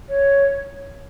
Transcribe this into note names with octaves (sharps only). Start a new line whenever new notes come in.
C#5